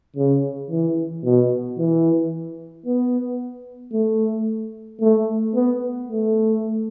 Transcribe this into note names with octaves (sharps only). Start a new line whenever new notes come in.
C#3
E3
B2
E3
B3
A3
A3
B3
A3